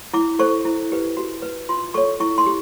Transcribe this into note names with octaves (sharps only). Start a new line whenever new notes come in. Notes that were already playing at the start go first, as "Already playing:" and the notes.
E4 D6
A4 C5 C#6
E4
G4 B4
F#4
B4
F4 C6
A4 C#5 C#6
E4 C#6
C6
G4